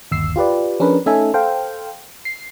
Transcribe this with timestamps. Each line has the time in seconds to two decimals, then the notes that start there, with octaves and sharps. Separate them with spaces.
0.11 G1 D#2 E6 C7
0.36 F4 G4 B4 D5
0.80 F3 C#4 D4 G#4 A#4 B4
1.06 A3 C#4 D#4 A4 E5 G#5
1.34 A4 C5 F5 G5
2.25 C7